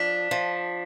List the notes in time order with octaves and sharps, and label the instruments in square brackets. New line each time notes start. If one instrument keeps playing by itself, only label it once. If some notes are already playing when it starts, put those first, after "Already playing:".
Already playing: [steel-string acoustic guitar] F3 D4 [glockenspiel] B6
[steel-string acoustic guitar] F3